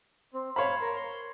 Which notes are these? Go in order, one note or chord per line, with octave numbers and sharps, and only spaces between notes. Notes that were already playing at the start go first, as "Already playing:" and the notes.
C4
C5 C#5 F5 B5
A#4
C6